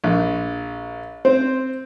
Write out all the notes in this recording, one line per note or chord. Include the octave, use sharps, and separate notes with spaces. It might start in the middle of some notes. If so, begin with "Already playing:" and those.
A#1
C4 C5